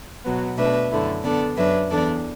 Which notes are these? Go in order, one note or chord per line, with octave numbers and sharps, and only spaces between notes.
B2 F#3 B3
B2 A3 D4 B4 E5
F#2 D3 A3 E4
D3 B3 D4 A4 D5
F#2 F#3 D4 B4 E5
E2 E3 B3 D4 A4 D5